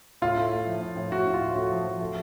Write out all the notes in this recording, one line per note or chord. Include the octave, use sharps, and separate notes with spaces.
A2 F4
A3
A3
F3
A2
A2
A2 F#4
A2
F4
A2
A3 F#4
F3
F3
A3